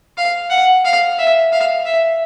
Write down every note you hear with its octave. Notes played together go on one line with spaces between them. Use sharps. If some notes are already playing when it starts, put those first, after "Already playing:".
F5
F#5
F5
E5
F5
E5